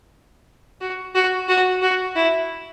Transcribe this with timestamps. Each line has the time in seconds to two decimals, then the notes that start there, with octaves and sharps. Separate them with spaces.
0.81 F#4
1.15 F#4
1.48 F#4
1.82 F#4
2.16 E4